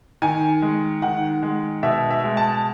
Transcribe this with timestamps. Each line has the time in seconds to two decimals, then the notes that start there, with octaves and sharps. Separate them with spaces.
0.22 D#3 G#5
0.62 G#3
1.02 D#3 F#5
1.43 G#3
1.83 B2 E5
2.11 E5
2.24 G#3
2.37 A5